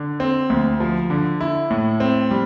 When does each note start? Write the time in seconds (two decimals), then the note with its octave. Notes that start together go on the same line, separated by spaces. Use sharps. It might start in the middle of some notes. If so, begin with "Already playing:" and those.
Already playing: D3
0.20 C4
0.50 D2
0.80 F3
1.10 D3
1.41 E4
1.71 A2
2.00 C4
2.31 G3